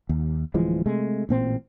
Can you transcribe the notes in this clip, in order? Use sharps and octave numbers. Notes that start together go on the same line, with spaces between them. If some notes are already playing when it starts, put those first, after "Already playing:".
D#2
D1 E3 F3 G#3
C3 G#3 A3
A1 A#2 C4